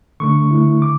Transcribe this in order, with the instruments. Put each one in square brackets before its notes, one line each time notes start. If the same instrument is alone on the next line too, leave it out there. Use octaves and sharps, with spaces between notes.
[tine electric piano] D3 A3 D4 C#6
D3 A3 E4
D3 D6